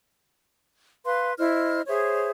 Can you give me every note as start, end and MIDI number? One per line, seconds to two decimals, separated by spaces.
1.05 1.33 71
1.05 1.33 77
1.05 1.33 84
1.38 1.81 64
1.38 1.81 72
1.38 1.81 75
1.38 1.81 89
1.87 2.31 68
1.87 2.31 72
1.87 2.31 73
1.87 2.31 76